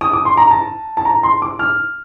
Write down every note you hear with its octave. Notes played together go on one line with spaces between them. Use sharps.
D#6
D6
C6
A#5
A5
A5
A#5
C6
D6
F6